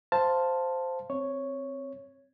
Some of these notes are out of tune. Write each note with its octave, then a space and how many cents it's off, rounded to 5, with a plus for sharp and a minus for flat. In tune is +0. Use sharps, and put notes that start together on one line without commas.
C5 -5 F5 +0 A5 +5
C4 +0 C#5 +0